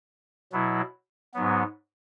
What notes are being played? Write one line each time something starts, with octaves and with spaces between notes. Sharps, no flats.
B2 F#3 E4
G#2 F#3 B3